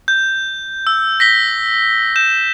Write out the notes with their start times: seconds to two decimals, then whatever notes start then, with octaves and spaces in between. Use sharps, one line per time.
0.08 G6
0.87 E6
1.20 A#6 B6 G7
2.16 G6 E7